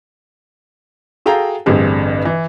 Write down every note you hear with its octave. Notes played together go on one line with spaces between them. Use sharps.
F#4 G#4 A4 F5 G5 A#5
A1 G2 D3 C4 G4 G#4
E3